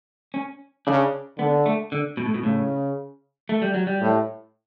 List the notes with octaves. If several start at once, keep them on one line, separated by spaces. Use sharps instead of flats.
C#4
C#3 D4
D3 B3
A3
D3
B2
A2
B2
A2 C#3
A3
G3
F#3
G3
A2